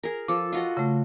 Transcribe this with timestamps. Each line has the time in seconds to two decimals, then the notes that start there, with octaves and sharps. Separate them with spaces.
0.03 G#4 A#4
0.28 F3 A4 D6
0.52 F4 F#4 D#5
0.77 C#3 A3